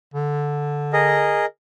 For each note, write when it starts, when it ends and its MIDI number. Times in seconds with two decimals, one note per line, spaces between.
0.14 1.44 50
0.93 1.46 68
0.93 1.46 70
0.93 1.46 75